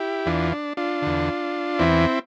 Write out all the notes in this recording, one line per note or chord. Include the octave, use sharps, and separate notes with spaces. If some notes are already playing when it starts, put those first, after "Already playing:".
Already playing: E4 G4
E2 E3 D4 F4
D4
D4 F4
E2 D3
E2 E3 C4 E4